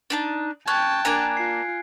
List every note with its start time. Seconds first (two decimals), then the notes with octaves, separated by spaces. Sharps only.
0.10 D4 D#4 A5
0.68 C#4 G5 A5 F#6 G#6
1.05 A#3 D4 G#5 A#5 G#6 D7
1.37 F4 C7